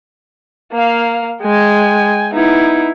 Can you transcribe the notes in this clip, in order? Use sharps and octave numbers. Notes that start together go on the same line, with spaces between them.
A#3 F5
G#3 G5 G#5
B3 D#4 E4